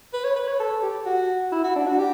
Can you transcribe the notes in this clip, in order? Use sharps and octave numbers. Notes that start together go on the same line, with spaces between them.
B4
C#5
B4
C#5
A4
G4
F#4
E4
F#4
D4
F#4
G4